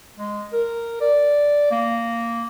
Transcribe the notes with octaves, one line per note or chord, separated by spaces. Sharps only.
G#3
A#4
D5
A#3